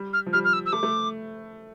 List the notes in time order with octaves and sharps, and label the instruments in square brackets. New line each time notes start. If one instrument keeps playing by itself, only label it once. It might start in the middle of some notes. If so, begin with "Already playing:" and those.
Already playing: [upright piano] G3
[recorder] F6
[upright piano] F3
[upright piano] G3 [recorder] F6
[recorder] F6
E6
E6
[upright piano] A3 [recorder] D6
[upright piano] A3